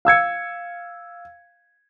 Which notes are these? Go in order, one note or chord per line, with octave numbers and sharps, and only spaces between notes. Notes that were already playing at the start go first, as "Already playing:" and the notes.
F5 E6 G#6 C#7